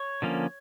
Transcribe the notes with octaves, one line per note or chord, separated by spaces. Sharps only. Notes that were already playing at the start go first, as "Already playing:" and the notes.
Already playing: C#5
D3 F3 A#3 C#4